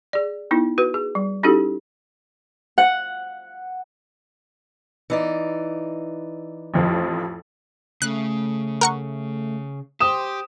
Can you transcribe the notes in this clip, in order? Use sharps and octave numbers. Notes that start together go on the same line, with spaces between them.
G#4 D5
B3 D#4 E4
F#4 B4
G#4
G3
C#4 D#4 E4 F#4 G4 A4
F#5
E3 D#4 D5
A1 F2 F3
C#3 A3 F#6
A#4 F#5 C#6
G4 C5 D#6 E7